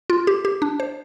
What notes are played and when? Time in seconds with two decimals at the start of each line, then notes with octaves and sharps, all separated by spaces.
0.10 F4
0.27 G4
0.45 G4
0.62 D4
0.80 C5